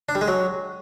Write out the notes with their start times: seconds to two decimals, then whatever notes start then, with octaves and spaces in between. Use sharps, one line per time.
0.09 D4
0.15 G3
0.21 G#3
0.28 F#3